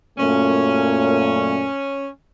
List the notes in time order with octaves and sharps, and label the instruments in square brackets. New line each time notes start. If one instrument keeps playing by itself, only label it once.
[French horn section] F#2 A#2 A3 [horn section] C#4